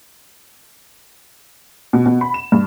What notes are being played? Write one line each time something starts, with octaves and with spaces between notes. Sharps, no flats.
B2
B2
B5
E7
G2